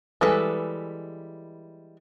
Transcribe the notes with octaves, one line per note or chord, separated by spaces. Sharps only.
E3 G3 G#3 A4 B4